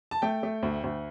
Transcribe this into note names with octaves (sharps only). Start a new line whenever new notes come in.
A5
A3 G5
A3
D2
D2